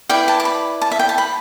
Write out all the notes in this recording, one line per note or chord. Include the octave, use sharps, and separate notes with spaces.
E4 B4 D5 G5
A5
D6
B5
A5
E5
G5
A5
B5